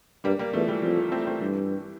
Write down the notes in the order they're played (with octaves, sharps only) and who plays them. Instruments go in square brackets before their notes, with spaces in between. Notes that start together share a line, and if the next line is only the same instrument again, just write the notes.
[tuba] G2 [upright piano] G3 A#3
[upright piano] G3 A#3
[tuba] E2 [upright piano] F3 A3
[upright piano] E3 G3
[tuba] F2 [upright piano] F3
[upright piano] F3
A3 C4
A3 C4
[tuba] G2 [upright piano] E3